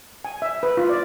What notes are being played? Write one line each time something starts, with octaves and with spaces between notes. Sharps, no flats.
G#5
E5
B4
F4
D5